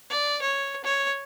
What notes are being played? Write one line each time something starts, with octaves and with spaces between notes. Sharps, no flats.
D5
C#5
C#5